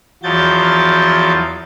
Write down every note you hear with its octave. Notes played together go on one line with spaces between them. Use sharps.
E2 F3 F#3 G6 A6